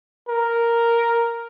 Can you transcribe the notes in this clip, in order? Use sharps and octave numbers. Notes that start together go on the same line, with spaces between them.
A#4